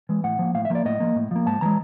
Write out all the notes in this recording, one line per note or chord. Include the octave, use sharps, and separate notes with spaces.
E3 G#3
A2 F#5
F3 A#3
A2 F5
E5
F3 A#3 D5
A2 D#5
F3 A#3
A2
F3 A#3
G#2 A5
E3 G#3 A#5